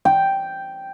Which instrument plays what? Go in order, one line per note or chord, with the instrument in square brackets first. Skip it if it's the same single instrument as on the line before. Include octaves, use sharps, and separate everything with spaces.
[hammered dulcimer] G5